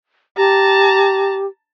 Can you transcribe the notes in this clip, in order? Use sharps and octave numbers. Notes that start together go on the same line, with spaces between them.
G4 A5 A#5